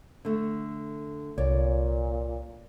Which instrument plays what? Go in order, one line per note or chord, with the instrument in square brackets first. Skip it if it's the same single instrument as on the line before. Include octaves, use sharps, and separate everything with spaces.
[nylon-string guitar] D3 A3
[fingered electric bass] C2 [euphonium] A#2 [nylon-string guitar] C#5 D5